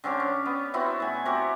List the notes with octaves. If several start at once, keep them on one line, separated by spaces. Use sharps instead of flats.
D3 C4 C#4 G4
C#4
B3
B3 C4 E4 F#4
A2 G#5
C4 F#4 G4 A#4